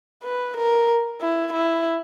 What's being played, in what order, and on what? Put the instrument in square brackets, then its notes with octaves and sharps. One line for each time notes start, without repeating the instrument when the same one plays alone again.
[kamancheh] B4
A#4
E4
E4